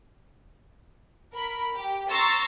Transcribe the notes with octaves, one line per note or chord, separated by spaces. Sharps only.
A#4 B5
G4
A#5 C6 C#6 E6 A6